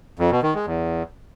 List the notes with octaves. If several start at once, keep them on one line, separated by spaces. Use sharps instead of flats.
F2
B2
D#3
G#3
E2